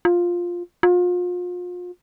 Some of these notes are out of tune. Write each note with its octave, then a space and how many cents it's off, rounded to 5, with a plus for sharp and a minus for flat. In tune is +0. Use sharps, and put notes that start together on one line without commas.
F4 +5
F4 +35